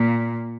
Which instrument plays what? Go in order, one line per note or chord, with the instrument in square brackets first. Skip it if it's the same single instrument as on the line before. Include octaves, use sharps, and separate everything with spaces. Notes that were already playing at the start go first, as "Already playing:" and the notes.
Already playing: [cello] A#2